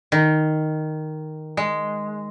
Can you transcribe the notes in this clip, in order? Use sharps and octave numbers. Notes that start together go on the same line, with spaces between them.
D#3
G#3